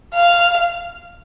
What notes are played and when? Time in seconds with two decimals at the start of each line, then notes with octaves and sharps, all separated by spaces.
0.14 F5